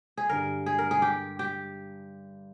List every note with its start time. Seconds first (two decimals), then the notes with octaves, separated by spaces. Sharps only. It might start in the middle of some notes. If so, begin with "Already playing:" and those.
0.17 G#4
0.29 G2 D3 G3 A#4
0.66 G#4
0.78 A#4
0.91 G#4
1.02 G4
1.39 G4